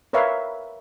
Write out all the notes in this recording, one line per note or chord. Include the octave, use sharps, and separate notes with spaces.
A#4 B4 C#5 E5 F5